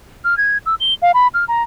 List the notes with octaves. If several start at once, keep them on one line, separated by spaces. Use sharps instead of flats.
F6
G#6
E6
G7
F5
B5
F6
A#5